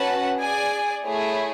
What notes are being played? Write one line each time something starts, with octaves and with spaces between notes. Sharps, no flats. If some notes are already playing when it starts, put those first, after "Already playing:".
Already playing: C#4 F#4 B4 F#5 A5
G#4 D5 G#5
A3 E4 G#4 C#5